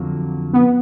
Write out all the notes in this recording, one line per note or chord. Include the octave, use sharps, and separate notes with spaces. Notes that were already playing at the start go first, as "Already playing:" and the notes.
Already playing: F2 D3 F#3 A#3
B3